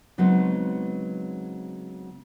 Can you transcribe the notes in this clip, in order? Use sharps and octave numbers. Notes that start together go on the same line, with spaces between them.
C#3 F#3 G#3 B3 C4 D#4